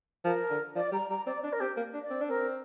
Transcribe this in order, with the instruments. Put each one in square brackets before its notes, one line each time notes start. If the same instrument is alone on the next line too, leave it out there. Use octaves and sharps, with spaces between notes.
[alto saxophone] F3 [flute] A#4
[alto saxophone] D3
[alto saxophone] F3 [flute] D5
[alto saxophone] G3 [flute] A#5
[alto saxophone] G3 [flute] A#5
[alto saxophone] C4 [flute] D5
[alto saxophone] D4 [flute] D5
[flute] A#4
[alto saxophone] C4 [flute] G4
[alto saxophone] A#3
D4
[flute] D5
[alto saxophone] C4
D4
[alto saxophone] C4 [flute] A#4